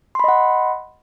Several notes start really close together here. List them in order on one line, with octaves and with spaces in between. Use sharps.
C6 B5 D#5 F#5